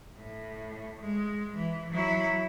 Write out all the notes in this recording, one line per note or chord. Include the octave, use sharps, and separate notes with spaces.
A2
G#3
E3
F#3 E4